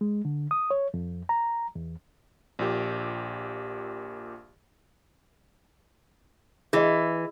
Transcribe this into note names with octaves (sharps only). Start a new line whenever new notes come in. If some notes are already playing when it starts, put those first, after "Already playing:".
G#3
D3
D#6
C#5
F2
A#5
E2
A#1 A#2 G4
E3 G#4 D#5